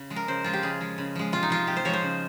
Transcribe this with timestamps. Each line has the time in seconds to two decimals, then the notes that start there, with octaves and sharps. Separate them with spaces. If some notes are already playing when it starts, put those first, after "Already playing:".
Already playing: C#3
0.10 F3 G#3
0.16 A#4
0.28 C#3 C5
0.44 F3 G#3 F4
0.53 G4
0.63 C#3 G#4
0.80 F3 G#3
0.98 C#3
1.15 F3 G#3
1.32 C3 F4
1.43 D#4
1.50 F3 G#3 F4
1.67 C3 G4
1.77 C5
1.85 F3 G#3 C#5
1.93 C5
2.03 C#3